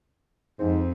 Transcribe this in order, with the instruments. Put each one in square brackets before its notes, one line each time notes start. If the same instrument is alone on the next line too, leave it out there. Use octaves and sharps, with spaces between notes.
[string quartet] F2 [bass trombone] G#2 [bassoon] C4